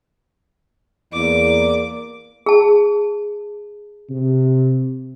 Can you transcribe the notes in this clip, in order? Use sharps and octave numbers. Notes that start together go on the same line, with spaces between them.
E2 A#3 D5 D6
G#4 A5
C3